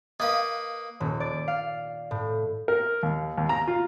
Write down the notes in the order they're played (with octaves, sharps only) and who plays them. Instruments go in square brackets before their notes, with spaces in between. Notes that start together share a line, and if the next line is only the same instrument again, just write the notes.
[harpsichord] A#3 B4 [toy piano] D#5 F5 [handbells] D#6
[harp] D#1
D5
F5
A2
[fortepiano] A#4
D#2
D#2
A#5
F4